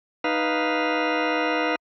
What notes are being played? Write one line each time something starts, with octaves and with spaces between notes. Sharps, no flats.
D#4 B4 F5